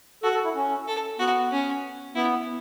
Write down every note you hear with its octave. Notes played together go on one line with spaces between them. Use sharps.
F#4 A4
A4
E4
C#4
A4
B3 F#4
C#4
B3 E4